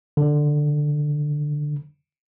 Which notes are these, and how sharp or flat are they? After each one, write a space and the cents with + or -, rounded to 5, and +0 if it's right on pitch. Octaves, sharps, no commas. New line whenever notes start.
D3 +10